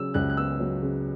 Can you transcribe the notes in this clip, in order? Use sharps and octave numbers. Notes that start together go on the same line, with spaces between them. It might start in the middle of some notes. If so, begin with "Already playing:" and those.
Already playing: C#3 F#3 E6
C#2 F#6
F#6
B3 E6
F#3
C#3